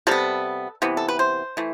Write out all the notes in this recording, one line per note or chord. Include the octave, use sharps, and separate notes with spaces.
C3 G3 B3 A4
C3 E3 B3
A4
B4
C5
E3 A3